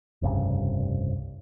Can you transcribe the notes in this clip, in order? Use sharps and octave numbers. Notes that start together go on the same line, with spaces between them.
F1 C2 G2 C#3